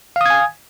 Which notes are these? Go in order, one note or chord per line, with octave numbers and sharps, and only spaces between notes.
F5 G#5 D#6 G#6